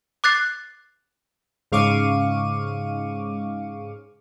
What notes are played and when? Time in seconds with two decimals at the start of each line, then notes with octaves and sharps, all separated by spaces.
0.24 D6 F#6 A6 C7
1.72 G#2 C#3 F5 C#6 D6 D#7